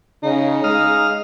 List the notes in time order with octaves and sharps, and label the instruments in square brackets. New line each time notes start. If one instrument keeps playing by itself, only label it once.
[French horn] C#3 [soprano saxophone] D#4
[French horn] G#3 [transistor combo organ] F5 D#6 F6